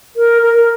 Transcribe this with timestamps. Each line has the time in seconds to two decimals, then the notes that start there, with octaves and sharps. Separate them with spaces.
0.16 A#4
0.42 A#4